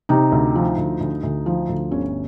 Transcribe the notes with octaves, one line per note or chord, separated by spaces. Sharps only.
C3 D#4
D2
F3
D2
D2
D2
F3
D2
G1 C#4